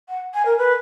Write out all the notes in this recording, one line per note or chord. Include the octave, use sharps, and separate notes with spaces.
F#5
G#5
A#4
B4